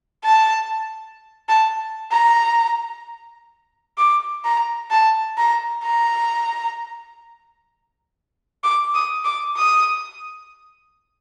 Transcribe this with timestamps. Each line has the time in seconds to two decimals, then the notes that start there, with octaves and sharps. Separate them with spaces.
0.24 A5
1.49 A5
2.12 A#5
3.98 D6
4.45 A#5
4.90 A5
5.38 A#5
5.83 A#5
8.64 D6
8.94 D#6
9.25 D6
9.57 D#6